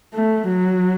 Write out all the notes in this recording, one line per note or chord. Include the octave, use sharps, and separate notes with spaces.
A3
F#3